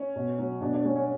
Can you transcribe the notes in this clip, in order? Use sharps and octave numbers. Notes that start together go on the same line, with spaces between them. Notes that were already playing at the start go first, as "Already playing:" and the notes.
Already playing: C#4
B2
F#3
B2 D4
D4
G3 C#4
C#4